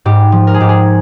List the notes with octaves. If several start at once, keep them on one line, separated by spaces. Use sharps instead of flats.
G#2 G4
F3
A#4
G#4
G#2 G4
G#4